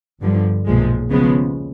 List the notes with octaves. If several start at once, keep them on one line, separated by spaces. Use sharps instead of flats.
G1 G2 D3 F3
B1 A#2 F3 G#3
D#2 C#3 F3 G#3 B3